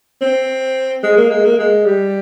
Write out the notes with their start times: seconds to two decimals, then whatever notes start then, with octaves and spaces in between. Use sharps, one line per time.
0.21 C4
1.03 G#3
1.17 A#3
1.30 G#3
1.45 A#3
1.59 G#3
1.86 G3